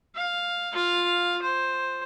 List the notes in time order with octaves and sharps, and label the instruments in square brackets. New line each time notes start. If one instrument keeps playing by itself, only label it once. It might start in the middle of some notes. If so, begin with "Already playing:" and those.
[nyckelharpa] F5
F4 F5
C5